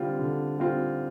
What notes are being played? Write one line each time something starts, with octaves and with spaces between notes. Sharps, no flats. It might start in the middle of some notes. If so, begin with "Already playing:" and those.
Already playing: D3 G3 C4 F4
D3
G3 C4 F4